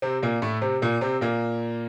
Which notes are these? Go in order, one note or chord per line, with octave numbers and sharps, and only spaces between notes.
C3 C4
A#2 A#3
A2 A3
C3 C4
A#2 A#3
C3 C4
A#2 A#3